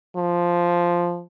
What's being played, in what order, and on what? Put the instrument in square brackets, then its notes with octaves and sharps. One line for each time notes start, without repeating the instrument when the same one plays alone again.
[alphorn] F3